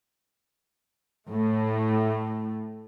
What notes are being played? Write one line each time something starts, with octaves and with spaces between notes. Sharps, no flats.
A2 A3